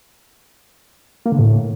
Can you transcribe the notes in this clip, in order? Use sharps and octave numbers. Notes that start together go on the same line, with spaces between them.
A#3
D3
A2